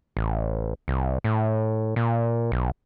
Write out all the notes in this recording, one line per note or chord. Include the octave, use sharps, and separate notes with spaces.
A1
C2
A2
A#2
B1